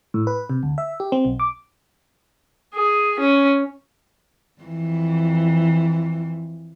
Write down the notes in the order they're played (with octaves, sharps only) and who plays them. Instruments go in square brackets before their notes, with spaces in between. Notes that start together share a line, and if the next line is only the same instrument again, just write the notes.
[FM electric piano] A2
B4
C3
D2
E5
G4
C4
B1
D6
[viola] G#4
C#4
[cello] F2 E3